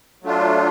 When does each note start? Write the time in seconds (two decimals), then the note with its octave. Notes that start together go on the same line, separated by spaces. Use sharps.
0.22 F#3 A3 D4 F4